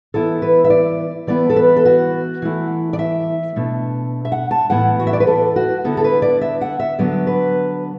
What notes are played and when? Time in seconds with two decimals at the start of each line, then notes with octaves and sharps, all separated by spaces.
0.14 E3 B3 E4 A4
0.42 B4
0.64 E5
0.70 D5
1.27 E3 B3 E4 D5
1.50 A4
1.56 B4
1.76 A4
1.85 F#4
2.42 E3 A3 E4
2.93 D5
2.99 E5
3.56 B2 A3 D4
4.25 E5
4.32 F#5
4.51 A5
4.70 A2 E3 B3 E4 F#5
5.00 F#4
5.07 E5
5.13 D5
5.20 B4
5.27 A4
5.56 F#4
5.84 D3 B3 E4 A4
5.97 A4
6.04 B4
6.22 D5
6.41 E5
6.61 F#5
6.80 E5
6.99 D3 F#3 B3 D5
7.27 B4